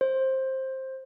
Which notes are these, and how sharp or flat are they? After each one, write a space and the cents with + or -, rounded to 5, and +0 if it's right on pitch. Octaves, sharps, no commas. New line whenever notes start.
C5 +15